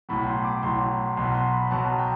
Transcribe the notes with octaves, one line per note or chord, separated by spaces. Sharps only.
B1 A2 F#3 B5
C6
D6
B1 A2 F#3 C6
B1 B2 F#3 C6
C6
B5
B1 B2 F#3 A5
G5